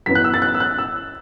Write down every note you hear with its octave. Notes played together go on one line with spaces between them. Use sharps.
F#2 E3 B3 B6
F#6
E6
A6
F#6
E6
F#6
E6